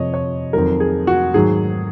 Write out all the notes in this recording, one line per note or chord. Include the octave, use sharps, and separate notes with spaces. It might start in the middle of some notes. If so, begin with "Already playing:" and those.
Already playing: F2 C3 F3 C#5 D#5
C#5
F2 D#3 F#3 A#4
G#4
F#4
G#2 D#3 F#3 G#4